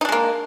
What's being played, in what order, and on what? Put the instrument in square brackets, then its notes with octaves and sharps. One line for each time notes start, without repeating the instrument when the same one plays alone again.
[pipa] D#4
D4
G#3
A#3